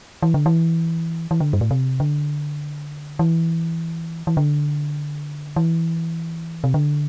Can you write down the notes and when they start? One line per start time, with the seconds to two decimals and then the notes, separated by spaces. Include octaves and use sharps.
0.23 E3
0.34 D3
0.46 E3
1.31 E3
1.40 D3
1.53 G2
1.61 A2
1.71 C3
2.00 D3
3.19 E3
4.27 E3
4.37 D3
5.56 E3
6.64 C3
6.74 D3